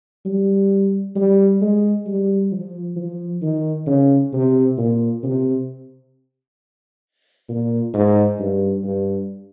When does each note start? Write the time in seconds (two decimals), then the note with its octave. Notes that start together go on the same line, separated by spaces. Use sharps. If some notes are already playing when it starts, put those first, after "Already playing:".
0.26 G3
1.16 G3
1.61 G#3
2.07 G3
2.52 F3
2.96 F3
3.42 D#3
3.87 C#3
4.33 C3
4.78 A#2
5.23 C3
7.49 A#2
7.94 G#2
8.39 G2
8.84 G2